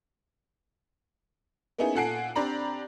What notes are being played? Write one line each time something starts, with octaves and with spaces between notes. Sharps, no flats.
A#3 B3 C#4 D#4 E4 G#4
A#2 A4 F#5 G#5 C7 D7
C4 D4 G4 D5 A#5 B5